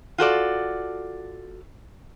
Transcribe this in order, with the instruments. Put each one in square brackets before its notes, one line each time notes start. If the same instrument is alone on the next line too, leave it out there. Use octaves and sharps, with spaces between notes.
[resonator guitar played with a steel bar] F4 F#4 A4 D5